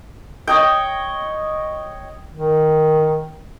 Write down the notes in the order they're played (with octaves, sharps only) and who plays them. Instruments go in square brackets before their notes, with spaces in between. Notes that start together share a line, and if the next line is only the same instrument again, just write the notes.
[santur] C#5 D#5 G5
[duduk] D#3